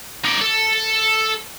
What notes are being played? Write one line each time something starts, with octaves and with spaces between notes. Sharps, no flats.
D#4 D5
A4